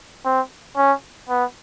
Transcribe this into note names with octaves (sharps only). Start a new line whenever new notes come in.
C4
C#4
B3